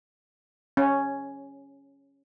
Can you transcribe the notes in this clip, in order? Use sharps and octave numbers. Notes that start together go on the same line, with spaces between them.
C#4